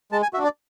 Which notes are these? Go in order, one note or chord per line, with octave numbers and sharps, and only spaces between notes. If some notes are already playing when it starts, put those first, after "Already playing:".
G#3 A5
G#5
D4 F#4 E5
D5